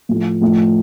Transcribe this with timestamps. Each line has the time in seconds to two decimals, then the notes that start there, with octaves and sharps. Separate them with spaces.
0.09 A2 F3 A3
0.41 A2 F3 A3